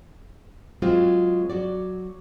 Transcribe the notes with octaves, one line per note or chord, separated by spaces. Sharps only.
F#3 G#3 C4 F4 F#4
F#3 F#4 D5